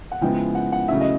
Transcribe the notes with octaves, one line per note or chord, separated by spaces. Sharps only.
F#5
C#3 F3 G#3 B3 E4 G5
F#5
F#5
C#3 F#3 A3 C#4 E4 E5
D#5